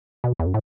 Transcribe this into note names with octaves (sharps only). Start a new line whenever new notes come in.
B2
E2
F#2
A2